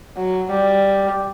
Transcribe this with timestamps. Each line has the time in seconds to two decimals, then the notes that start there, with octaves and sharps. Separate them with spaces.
0.17 F#3
0.50 G3